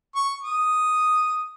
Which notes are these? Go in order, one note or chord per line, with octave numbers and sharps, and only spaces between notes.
C#6
D#6